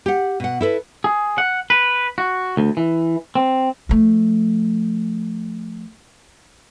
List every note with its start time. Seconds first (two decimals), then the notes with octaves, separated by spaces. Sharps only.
0.06 G4 F#5
0.40 B2 F#5
0.61 E4 A4 B4
1.04 G#4
1.38 F#5
1.70 B4
2.18 F#4
2.57 D2
2.77 E3
3.35 C4
3.89 F3 A3